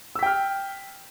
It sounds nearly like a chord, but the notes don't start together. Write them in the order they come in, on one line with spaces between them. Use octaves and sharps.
E6 B6 G5 F6